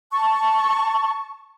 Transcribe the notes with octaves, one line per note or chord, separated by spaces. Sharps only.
A5 C#6